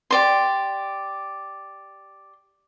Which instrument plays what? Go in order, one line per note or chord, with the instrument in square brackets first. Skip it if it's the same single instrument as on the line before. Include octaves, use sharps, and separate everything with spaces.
[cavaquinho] G4 D5 C6